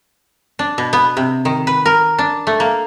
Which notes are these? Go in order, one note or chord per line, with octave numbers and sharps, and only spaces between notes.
D4
B2
B3
C3
D#3
B4
A#4
D4
A3
A#3